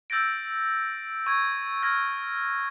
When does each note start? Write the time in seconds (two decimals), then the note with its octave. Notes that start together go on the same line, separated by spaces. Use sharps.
0.10 E6 G6 A6 A#6 D7
1.26 C#6 G#6
1.82 F6 G#6 A#6